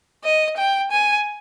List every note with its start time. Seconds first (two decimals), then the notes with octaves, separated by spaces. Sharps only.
0.24 D#5
0.57 G5
0.91 G#5